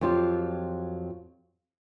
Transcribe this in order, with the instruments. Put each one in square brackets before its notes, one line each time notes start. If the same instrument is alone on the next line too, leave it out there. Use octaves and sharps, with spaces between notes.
[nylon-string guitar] F2 F#3 C4 F4 G4